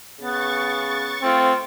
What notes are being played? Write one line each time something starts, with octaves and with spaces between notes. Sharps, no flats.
C#3 B3 C#6 A6
A3 C4 F4